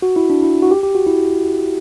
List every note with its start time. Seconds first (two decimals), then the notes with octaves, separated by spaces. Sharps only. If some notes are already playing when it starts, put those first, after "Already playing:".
0.02 F#4
0.16 E4
0.30 D4
0.43 E4
0.62 F#4
0.71 G4
0.83 G4
0.95 F#4
1.06 E4